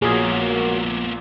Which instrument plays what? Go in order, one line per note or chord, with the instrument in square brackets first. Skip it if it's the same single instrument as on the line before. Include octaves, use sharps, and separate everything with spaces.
[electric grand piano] A#1 A#2 [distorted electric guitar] A#3 B3 [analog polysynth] F#4 A#4 C#5 [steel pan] G#4